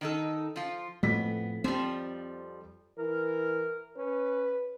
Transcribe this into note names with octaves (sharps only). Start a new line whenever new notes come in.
D#3 D#4 A4
F3 F4
F2 A2 B3 B6
F3 G3 C4
E3 A#4
C#4 B4